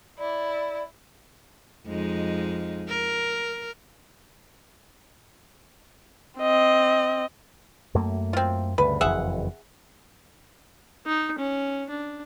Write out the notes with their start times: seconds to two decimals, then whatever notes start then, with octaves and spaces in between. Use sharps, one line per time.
0.19 E4 D5
1.86 F2 G#3 D#4
2.89 A#4
6.39 C4 D#5
7.94 F#2 A3 A#3
8.33 C4 F4
8.78 D2 G2 C#3 B4
9.01 F#1 F2 E3 G#4 E5 F#5
11.06 D#4
11.39 C#4
11.90 D4